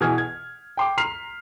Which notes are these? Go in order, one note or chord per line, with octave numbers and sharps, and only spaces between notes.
B2 E3 G#4 F6 G#6
G#6
G5 C6 D6
A#5 C6 F6 B6 C7 F7